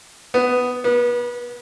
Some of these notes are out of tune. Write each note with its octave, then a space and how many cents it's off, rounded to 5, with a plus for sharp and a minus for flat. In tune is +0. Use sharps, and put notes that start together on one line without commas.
B3 +10
B3 -30